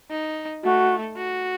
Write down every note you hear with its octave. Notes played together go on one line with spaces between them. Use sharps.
D#4
A3 F#4
F#4